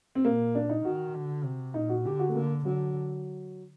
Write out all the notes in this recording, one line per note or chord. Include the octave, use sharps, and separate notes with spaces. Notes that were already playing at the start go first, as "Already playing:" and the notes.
C4
A#2 A#3
D4
D#4
D#3 F#4
D3
C3
A#2 D#4
F#4
D3 G4
F#4
A3
D3 A#3
D3 F#3